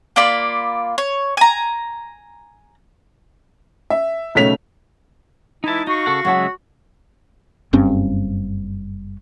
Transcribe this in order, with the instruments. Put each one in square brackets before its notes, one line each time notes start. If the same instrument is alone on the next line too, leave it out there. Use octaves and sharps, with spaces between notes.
[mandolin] A#3 F4 D5 B5
C#5
G#5 A#5
[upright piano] E5
B1 C#3 A3 C#5 B6 F7
[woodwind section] E3 G#3 E4 [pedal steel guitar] D#4 A5
[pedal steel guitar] D#4 [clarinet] F#4 [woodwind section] F5 C#6
[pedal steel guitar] C#3 A4 F#5
[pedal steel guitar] C#3 G#3 E5 [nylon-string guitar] F#3 F#5 A5
[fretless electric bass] F#1 G2 C4 C#4